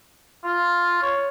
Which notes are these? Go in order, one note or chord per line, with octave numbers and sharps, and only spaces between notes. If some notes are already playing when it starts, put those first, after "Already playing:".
F4
C#5